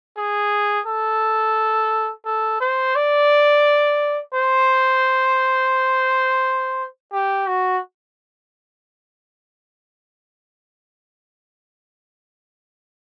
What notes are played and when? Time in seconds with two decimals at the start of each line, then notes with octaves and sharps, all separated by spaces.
0.17 G#4
0.86 A4
2.25 A4
2.61 C5
2.95 D5
4.34 C5
7.13 G4
7.47 F#4